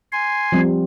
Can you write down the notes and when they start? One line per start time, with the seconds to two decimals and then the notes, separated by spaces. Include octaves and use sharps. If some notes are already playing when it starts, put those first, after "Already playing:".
0.12 G#5 C6
0.52 F3 G3 C4